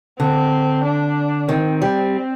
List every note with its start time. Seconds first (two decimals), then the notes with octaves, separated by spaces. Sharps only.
0.19 D3 C4
0.84 D4
1.49 D#3 C4
1.82 G3